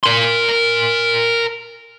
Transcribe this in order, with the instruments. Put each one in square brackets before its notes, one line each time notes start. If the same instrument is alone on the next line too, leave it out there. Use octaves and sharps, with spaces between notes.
[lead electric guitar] A#4 C6